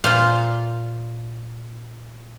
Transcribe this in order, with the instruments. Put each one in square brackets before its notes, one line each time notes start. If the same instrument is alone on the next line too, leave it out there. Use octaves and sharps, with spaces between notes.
[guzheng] A#2 [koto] F4 C5 F5